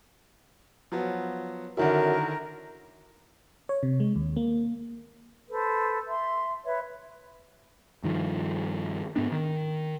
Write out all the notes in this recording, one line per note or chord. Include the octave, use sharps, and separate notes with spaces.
F3 F#3 B3
F#2 D3 D#3 E4 A#4
C#5
C3
G#3
D#2
A#3
A4 B4 C5
E5 C6
B4 C#5 E5
G2 D#3 F3
G#2 B3 D4
D#3